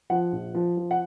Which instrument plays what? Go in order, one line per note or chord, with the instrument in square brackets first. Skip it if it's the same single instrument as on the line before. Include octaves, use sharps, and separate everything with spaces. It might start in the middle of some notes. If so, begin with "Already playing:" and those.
[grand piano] F3 F#5
A#1
F3
F3
F#5